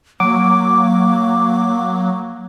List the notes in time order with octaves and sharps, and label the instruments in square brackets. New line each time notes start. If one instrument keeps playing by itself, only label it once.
[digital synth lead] F#3 [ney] A#3 [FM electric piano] D6